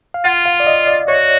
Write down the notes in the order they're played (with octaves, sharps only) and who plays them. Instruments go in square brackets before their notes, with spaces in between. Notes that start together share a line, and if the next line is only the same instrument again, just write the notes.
[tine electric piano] F5
[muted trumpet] F4 [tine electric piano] F#5
[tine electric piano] F5
D5
D#5
D5
[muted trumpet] F#4 [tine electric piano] C#5